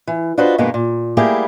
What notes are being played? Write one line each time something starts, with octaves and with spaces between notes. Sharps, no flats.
E3
D4 F4 F#4 B4 C5 D#5
G2 B2 G#3 A#3 B3
A#2
G3 A3 A#3 E4 G4 G#4